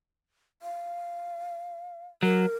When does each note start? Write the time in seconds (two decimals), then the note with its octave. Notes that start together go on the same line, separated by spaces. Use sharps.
0.62 F5
2.23 F#3 A#4